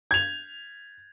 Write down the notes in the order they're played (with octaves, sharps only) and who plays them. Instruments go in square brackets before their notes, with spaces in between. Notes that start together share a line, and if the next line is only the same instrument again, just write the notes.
[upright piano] G#6 F7